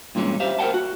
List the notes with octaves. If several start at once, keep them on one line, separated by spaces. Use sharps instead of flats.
G2 A#2 E3 G#3 C#4
G4 C5 E5 F5
A#4 C5 D5 F#5 G5 A5
F#4